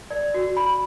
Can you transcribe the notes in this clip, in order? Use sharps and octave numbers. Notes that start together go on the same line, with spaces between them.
D5
F#4
B5